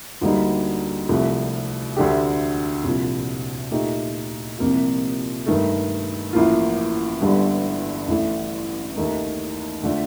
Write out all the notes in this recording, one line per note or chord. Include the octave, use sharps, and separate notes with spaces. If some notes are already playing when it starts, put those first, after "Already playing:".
D2 D3 G3 A#3 D#4
C2 C3 F3 A3
D2 D3 A3 D4 G4
C2 A#2 F3
A#2 A3 D#4 G4
C2 C3 F3 A#3 F4
G2 D#3 A3
A1 A2 F3 A#3 F4
G1 G2 D3 G3
A1 A2 A3
D#2 D#3 A3 D#4
D3 A3 D4 F4